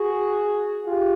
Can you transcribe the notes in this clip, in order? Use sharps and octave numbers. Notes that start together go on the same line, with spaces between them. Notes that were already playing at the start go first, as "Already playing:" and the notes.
Already playing: F#4 G#4
F4 G4